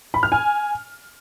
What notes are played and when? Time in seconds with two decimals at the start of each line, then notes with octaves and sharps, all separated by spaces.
0.14 B5
0.23 F6
0.32 G#5